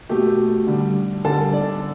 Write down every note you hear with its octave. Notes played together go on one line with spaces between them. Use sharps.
B2 A3 G4
D3 G3
D3 G3 A4
D5